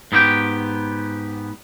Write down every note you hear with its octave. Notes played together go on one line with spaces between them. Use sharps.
G#2 B3 E4 G4 G5